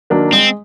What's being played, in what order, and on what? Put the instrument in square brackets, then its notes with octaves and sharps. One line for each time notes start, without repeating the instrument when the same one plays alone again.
[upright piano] D#3 F#3 A#3 D4
[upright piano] G#3 [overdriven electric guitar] C4